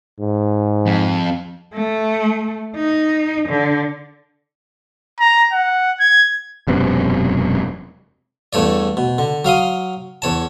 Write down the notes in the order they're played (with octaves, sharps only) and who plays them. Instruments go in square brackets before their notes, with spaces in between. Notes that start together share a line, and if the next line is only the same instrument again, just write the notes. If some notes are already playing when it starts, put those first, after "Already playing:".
[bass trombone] G#2
[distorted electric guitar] F2
[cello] A3
D#4
D3
[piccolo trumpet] A#5
F#5
G#6
[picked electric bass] E1 F#2 C3 B3
[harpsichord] E2 G2 A3 C#5 D5
B2
D3
F#3 F5 C6 D#6
E2 C#5 A5